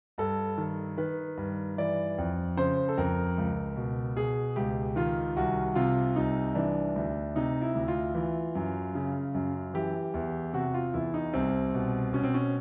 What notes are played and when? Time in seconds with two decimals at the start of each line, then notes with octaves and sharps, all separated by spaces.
0.18 G2 A4
0.58 D#3
0.98 D#3 B4
1.37 G2
1.78 E3 D5
2.18 F2
2.57 C#3 C5
2.89 A4
2.98 F2 A#4
3.38 C#2
3.76 B2
4.16 B2 G#4
4.56 C#2 G4
4.96 D#3 F4
5.36 C2 F#4
5.75 C3 F4
6.16 C2 D#4
6.55 E3 D4
6.96 D2
7.35 C3 D#4
7.61 E4
7.75 D2
7.88 F4
8.15 E3
8.55 F#2
8.95 C#3
9.34 F#2
9.74 E3 G4
10.14 E2
10.53 C3 F#4
10.74 F4
10.94 E2 E4
11.14 D#4
11.33 C2 C4
11.74 B2
12.13 B2 C#4
12.24 C4
12.34 C#4